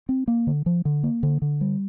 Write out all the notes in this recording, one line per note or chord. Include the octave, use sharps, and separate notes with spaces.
C4
A#3
D3
F3
D3
A#3
D3
D3
G3